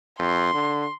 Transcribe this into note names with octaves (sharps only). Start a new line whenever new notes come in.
F2 C6
D3